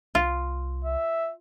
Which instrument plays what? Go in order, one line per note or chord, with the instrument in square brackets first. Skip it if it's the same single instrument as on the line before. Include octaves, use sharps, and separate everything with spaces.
[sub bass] C2 [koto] F4
[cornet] E5